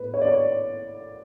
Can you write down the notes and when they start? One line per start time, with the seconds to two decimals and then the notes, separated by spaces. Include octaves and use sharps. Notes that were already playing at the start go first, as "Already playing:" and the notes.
Already playing: A2 B4
0.14 C#5
0.22 D5
0.28 C#5